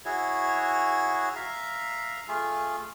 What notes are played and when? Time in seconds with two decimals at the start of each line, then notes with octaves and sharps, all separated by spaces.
0.05 E4 F#4 G#4 C#5
1.36 E5 F5 A#5
2.28 A3 F4 G#4